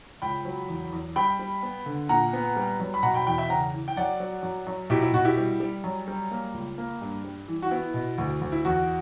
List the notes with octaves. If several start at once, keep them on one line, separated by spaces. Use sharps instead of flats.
C#2 G5 B5
F#3
E2
E2
G3 G5 B5
G3
B3
D3
A#2 F#5 A#5
B3
G3
F#2
B5
B2 F#5 A#5
G5 B5
E2 G5 B5
E5 G5
C#3 F#5 A#5
E3
G5
F#2 D5 F#5
F#3
F#2
F#2
B2 E4 G4
E4
B2 F#4
E4 G4
G3
G3
F#2
G3
A#3
C#2
A#3
G2
G3
E3
F#4
B3 E4
B2
D2
D2
E4
E2 F#4